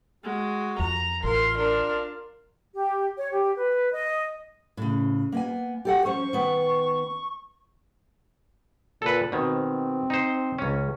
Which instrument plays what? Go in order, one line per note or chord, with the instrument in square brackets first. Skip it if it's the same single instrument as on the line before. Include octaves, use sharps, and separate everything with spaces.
[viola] G#3 [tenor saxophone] F#4
[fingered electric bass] F2 [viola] A#5
[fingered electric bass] A1 [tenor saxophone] F4 [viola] A#4 [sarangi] C6
[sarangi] D4 [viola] A#4
[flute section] G4
C#5
G4
B4
D#5
[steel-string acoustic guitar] A2 C#3
A#3 B3 G#5
G4 A4 F#5
[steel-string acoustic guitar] F3 C#4 C5 [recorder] C#6
[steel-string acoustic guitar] D#3 B3 B4
[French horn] A#2 [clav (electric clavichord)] A4 B4
[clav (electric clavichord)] B2 D#3 [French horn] C4
[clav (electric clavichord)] D#4 C5
C#2 C#4